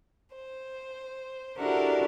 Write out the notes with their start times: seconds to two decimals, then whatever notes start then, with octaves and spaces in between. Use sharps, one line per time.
0.35 C5
1.57 D4 E4 F#4 G4 A4 A#4